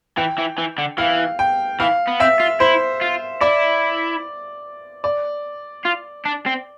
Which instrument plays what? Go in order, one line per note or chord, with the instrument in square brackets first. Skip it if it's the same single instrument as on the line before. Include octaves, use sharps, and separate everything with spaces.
[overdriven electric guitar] E3 [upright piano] G5
[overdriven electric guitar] E3
E3
D3
[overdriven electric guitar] E3 [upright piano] F5
[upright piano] G5
[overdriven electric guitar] E3 [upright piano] F5
[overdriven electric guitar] B3
[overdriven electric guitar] C4 [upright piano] E5
[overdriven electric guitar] F4
[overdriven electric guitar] E4 [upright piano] C5
[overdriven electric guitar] F4
[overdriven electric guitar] E4 [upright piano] D5
[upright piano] D5
[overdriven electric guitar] F4
D4
C4